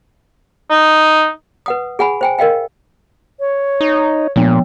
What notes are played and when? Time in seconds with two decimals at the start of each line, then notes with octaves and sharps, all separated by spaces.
0.70 D#4
1.66 B4 F#5 D#6
1.99 G#4 F#5 G#5 B5
2.21 C5 G5 G#5
2.39 A#4 D#5 F5 G5
3.40 C#5
3.81 D#4
4.36 A#2 F3 B3